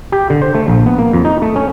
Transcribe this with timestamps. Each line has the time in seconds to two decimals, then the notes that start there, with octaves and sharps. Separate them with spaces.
0.12 G4
0.30 D3
0.42 C5
0.55 A3
0.68 A#1
0.86 B3
0.99 A#3
1.13 F2
1.25 D#4
1.42 A3
1.56 C#4